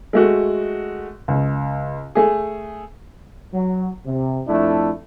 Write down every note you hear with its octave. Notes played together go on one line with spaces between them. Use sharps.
G#3 A3 F#4
C#2
A3 G#4
F#3
C3
F2 A3 D4 E4